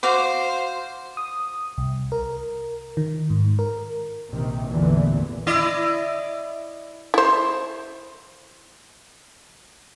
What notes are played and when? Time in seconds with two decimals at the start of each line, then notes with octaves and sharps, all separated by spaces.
0.03 F#4 C5 F5 D6
1.17 D#6
1.78 C2
2.12 A#4
2.97 D#3
3.30 G#2
3.59 A#4
4.31 A#1 C3 D#3
4.68 A1 E2 A#2 D3 E3
5.47 E4 D5 D#5
7.14 E4 C5